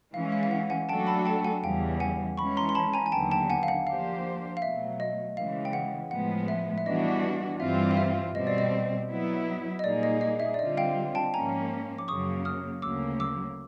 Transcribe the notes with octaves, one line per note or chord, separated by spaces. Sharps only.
E3 G#3 C#4 F5
F5
F5
F#5
F#5 G#5
F#3 A3 D4 F#4 A4 G5 A5
A5 B5
G5 A5
F#5 G#5
E2 C#3 E3 G3 F5 G5
F#5 G#5
E3 G#3 C#4 B5 C#6
A#5 C6
C6
A5 B5
G#5 A#5
G#5
D#2 D3 F#3 B3 G5 A5
G5 A5
F#5 G#5
F5
F#5
F3 A#3 D4 G4 C5 F5
F5
B2 F#3 A3 E5
D#5
C#3 E3 G#3 F5
G5
F#5
A2 F3 G#3 B3 F#5
E5
E5
E3 G3 B3 D4 F#4 D#5
G2 E3 G3 C4 F4 E5
F5
E5
B2 G3 C4 D#5
D5
D#5
F#3 B3 E4
D#5
A#2 G3 A#3 D#4 G#4 D5
D#5
D#5
E5
D5
D3 G3 C4 F4 D#5
F5 G5
G5 A5
G#2 F3 A#3 C#4 G#5 A#5
D6
F#2 C#3 F#3 A#3 C#6 D#6
D#6 F6
D2 C#3 F#3 A#3 D6 E6
D6 E6